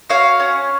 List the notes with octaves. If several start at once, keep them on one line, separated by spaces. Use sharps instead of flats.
F#4 C#5 F5
C#4